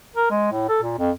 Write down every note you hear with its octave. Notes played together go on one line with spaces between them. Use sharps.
A#4
G#3
A2
A4
A#2
F2